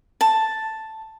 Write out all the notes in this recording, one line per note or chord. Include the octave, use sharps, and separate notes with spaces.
A5